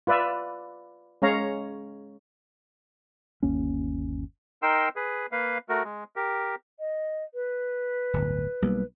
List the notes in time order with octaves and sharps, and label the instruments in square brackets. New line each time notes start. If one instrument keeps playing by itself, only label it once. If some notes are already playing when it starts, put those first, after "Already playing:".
[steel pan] F4 B4 D5 E5
G#3 C#4 C#5 F5 A#5
[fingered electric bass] G1 D#2 A#3 C#4
[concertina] D#4 A#4 G5 C6 E6
G#4 B4
A#3 B4 F5
A3 F#4 A#4
G#3
G4 A#4
[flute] D#5
B4
[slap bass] D1 G1
B1 G3 A#3